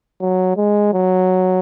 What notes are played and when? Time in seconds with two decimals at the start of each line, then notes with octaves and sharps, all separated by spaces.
0.21 F#3
0.57 G#3
0.93 F#3